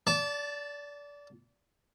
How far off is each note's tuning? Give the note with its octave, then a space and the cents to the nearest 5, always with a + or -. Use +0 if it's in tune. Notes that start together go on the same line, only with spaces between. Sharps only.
D5 -25 A5 +0